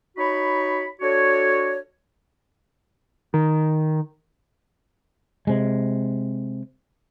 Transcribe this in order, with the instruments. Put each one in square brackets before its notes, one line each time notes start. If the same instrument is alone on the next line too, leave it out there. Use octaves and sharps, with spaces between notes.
[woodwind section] D#4 F#4 C#5 B5
D4 F#4 A4 C#5
[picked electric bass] D#3
[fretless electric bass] C3 G#3